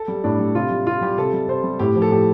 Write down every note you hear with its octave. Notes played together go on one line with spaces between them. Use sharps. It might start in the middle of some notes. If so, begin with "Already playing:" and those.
Already playing: A4
G3
A2 D4
G3
C3 F4
G3
C3 F4
G3 G4
C3 A4
G3
C3 C5
G3
A2 G4
F3
A4
A2 G4